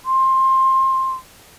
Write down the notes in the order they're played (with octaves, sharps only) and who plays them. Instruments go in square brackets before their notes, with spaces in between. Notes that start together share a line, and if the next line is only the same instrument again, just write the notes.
[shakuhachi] C6